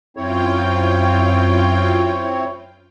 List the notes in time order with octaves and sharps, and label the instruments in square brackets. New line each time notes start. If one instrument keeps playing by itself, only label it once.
[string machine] F#2 F4 G5 [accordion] C4 E4 C#5